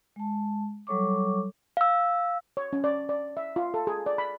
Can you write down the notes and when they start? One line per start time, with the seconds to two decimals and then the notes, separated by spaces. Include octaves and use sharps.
0.16 G#3 A5
0.87 F#3 G3 A4 C#5 C#6 D6
1.77 F5 E6
2.57 C#5
2.73 C#4
2.84 D5
3.09 D5
3.37 E5
3.56 F4
3.74 A4
3.87 G#4
4.06 D5
4.18 B5